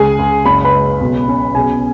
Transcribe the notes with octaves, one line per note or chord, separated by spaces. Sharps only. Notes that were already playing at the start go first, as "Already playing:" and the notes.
Already playing: C#2 G#4 G#5
C#2
F#1 B5
B4 B5
G#3
B1
C#4
B1 G#4 G#5